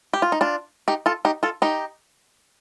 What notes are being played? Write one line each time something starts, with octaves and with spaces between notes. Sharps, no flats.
G4
F4
D#4
D4 F4
D#4 G4
F4 A4
D#4 G4
F4 A4
D#4 G4